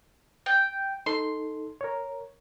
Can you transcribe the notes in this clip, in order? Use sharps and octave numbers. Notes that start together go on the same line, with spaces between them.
G5
D#4 A4 C6
A#4 C#5